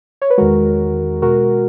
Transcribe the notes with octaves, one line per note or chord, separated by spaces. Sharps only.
C#5
B4
E2 D#3 G#3 F#4 A#4
B2 G#3 F#4 A#4